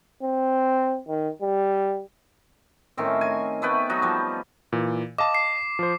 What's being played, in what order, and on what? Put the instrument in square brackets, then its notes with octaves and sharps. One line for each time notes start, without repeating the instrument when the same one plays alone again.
[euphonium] C4
D#3
G3
[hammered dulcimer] A2 D#3 C4 C#4
G#5
A3 B3 B4 G5
F#3 D#4 F#4
F3 G3
[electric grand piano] A#2 E3
[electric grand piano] D#5 F5 A5 [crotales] D6
[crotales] C7
[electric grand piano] F3 C5